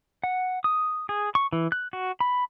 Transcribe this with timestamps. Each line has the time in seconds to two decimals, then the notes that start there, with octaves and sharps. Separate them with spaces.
0.24 F#5
0.64 D#6
1.09 G#4
1.35 C#6
1.53 E3
1.72 F#6
1.93 F#4
2.20 B5